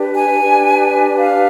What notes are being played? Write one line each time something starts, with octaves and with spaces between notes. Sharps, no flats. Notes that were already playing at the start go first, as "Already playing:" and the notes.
Already playing: D4 G4 B4
G#5
D4 G4 B4
F5